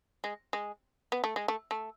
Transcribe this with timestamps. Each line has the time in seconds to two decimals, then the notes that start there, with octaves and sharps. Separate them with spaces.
0.24 G#3
0.53 G#3
1.12 B3
1.24 A3
1.36 G#3
1.48 A3
1.71 A3